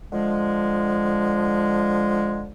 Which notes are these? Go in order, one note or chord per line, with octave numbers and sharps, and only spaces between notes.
D3 F3 G#3